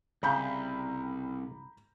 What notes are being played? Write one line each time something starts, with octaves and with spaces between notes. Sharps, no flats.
C2 C#3 F5 A#5 B5 G6